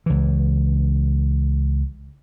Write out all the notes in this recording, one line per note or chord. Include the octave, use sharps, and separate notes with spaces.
C#2 E3